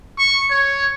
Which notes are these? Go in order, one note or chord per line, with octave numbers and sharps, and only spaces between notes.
C#6
C#5